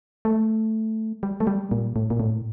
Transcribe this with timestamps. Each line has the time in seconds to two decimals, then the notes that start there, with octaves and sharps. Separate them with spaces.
0.25 A3
1.23 G3
1.40 A3
1.47 G3
1.71 A#2
1.96 A2
2.10 A#2
2.20 A2